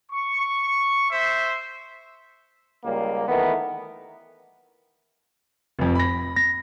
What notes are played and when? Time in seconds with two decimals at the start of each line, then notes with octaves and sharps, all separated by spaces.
0.11 C#6
1.11 C5 E5
2.84 C#2 G3 A#3
3.28 D#3 E3 A3 B3 A#4
5.79 F1 F2
5.95 B5 A#6
6.36 A#6